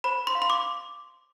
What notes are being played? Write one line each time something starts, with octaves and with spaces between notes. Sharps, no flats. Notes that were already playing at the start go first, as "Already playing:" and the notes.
C5 B5
C6
F5
C6
D6